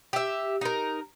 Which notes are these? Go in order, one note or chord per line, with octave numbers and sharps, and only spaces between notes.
G4 E5
D#4 A#4